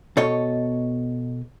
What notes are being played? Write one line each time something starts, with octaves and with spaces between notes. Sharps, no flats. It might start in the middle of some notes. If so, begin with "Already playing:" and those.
B2 A4 C#5 D#5